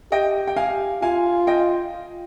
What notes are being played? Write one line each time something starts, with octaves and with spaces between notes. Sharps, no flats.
G4 D#5 G5
G5
F5 G#5
F4 F5 G#5
D#5 G5